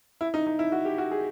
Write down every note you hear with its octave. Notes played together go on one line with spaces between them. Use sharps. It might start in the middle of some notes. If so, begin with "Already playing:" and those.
E4
D#4
D#4
E4
F#4
G4
F#4
G#4